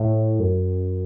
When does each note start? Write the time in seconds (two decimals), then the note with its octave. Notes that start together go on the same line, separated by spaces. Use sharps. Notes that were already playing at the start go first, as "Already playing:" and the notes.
Already playing: A2
0.39 F#2